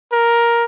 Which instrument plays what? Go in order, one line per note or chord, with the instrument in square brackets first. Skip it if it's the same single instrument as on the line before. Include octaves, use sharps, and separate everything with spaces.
[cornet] A#4